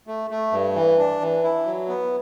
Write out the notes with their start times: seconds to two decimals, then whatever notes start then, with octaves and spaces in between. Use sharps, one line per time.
0.07 A3
0.30 A3
0.52 G2
0.76 E3
0.98 D4
1.21 E3
1.44 E4
1.65 F#3
1.88 B3